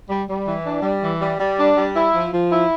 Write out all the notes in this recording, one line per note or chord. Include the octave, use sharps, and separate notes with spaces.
G3
G3
E3
D4
G3
E3
G3
G3
D4
G3
E4
F3
F3
E4